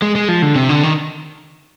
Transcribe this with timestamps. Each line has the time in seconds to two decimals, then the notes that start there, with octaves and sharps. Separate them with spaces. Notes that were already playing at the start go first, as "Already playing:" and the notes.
0.02 G#3
0.15 G#3
0.28 F3
0.42 D3
0.55 C3
0.69 D3
0.83 D#3